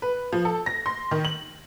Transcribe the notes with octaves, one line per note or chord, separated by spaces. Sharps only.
B4
F3
A4
A#6
C6
D#3
F#7